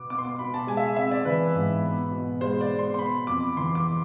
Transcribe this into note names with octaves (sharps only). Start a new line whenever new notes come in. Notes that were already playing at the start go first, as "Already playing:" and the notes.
Already playing: B2 B3 D6
B3 D6
C6
D6
B2 B5
A5
G#3 G#5
E5
F5
C4 E5
D5
E3 B4
G#2
B3
B2
G#3 C5
D5
B2
C6
C6
B3 B5
F2 D6
E3 C6
D6